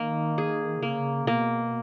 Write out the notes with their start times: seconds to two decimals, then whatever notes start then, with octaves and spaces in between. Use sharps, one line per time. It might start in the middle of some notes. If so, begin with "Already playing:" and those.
Already playing: D#3 A#3
0.38 G#4
0.83 C#3 A#3
1.27 B2 A#3